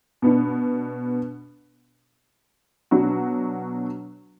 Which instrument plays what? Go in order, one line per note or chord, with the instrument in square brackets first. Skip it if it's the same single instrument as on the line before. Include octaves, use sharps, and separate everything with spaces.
[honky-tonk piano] B2 B3 D4
B2 F#3 D4 F#4